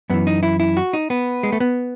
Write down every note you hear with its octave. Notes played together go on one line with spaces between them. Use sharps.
F#2 E3 B3
D#4
E4
E4
F#4
D#4
B3
G#3
A3
B3